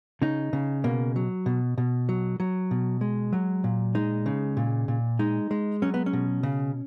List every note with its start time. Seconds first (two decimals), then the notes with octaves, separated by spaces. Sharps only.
0.22 C#3 D#4
0.53 C#3
0.84 B2 A#3
1.16 F#3
1.46 B2
1.78 B2
2.09 F#3
2.40 F#3
2.71 B2
3.01 G#3
3.33 F#3
3.64 A#2
3.95 G#3 D#4
4.26 C#3
4.57 A#2
4.88 A#2
5.19 G#3 D#4
5.51 G#3
5.82 F#3 C#4
5.94 B3
6.06 C#4
6.13 B2
6.43 C#3